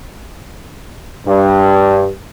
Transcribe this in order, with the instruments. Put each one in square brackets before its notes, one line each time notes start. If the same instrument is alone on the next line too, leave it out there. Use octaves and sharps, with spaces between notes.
[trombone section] G2